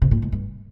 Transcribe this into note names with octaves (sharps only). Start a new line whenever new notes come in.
C3
A#2
G#2
G2